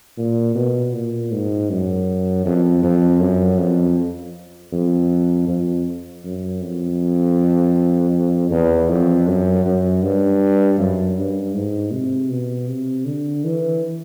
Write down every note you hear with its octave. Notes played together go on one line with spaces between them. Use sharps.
A#2
B2
A#2
G#2
F#2
F2
F2
F#2
F2
F2
F2
F#2
F2
E2
F2
F#2
F#2
G2
F#2
G2
G#2
C3
B2
C3
D3
E3